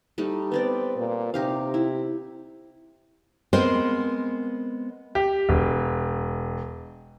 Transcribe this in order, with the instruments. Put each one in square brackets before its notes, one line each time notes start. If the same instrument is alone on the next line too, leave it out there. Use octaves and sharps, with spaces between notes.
[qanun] G3 A3 D#4
[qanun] B3 C4 D5 [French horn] B4
[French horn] A#2
[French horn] C3 [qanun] D#4 G4 F5
[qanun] E4
[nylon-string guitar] G#3 B3 C4 A#4 C5
[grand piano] G4
E1